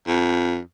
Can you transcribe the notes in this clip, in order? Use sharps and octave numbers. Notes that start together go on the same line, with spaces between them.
F2